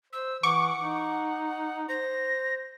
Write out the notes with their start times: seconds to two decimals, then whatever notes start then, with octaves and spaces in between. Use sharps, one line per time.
0.13 C5 E6
0.43 E3 F#5 C#6 D6
0.81 D#4
1.89 C5 A#6